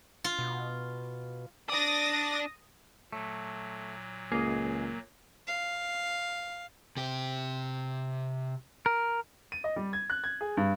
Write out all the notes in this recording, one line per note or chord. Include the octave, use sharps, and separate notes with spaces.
F4
B2
D4 D5 D#6 A6 A#6
A#2 F#3 A3
C#2 A#3 G#4 D#5
F5
C3 G4
A#4
D#7
D#5
G3
G#6
F#6
G#6
G#4
G2